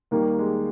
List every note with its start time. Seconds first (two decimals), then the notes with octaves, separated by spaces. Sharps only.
0.11 D#2 D#3 G3 A#3
0.38 G#3